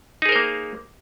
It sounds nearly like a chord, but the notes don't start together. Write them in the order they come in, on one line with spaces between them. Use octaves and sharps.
D#4 G#4 A#4 C5 A#3